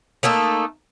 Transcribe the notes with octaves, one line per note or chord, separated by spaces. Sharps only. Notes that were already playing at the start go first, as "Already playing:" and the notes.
A3 A#3 D#4 A4